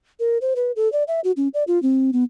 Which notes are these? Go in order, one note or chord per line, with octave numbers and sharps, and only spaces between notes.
A#4
C5
B4
A4
D5
E5
F#4
C#4
D5
F4
C4
B3